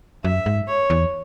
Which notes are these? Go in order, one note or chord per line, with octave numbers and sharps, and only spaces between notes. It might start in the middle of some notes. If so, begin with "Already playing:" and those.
F#2 E5
G#2
C#5
E2